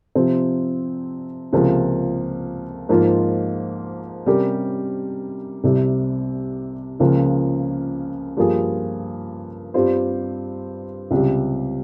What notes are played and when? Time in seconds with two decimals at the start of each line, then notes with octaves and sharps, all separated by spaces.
0.15 C3 F3 C4
1.53 C#2 C3 F3 A#3
2.89 G#2 F3 A#3 F4
4.26 C3 G3 C#4 G4 A#4
5.64 C2 C3 G3
7.00 C#2 C#3 F3 A#3
8.37 G2 F3 A#3 F4 G#4
9.74 G2 G3 C4 F4 C5
11.11 C#2 C3 G3